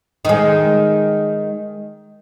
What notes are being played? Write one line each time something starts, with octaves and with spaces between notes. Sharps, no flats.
D#3 G#3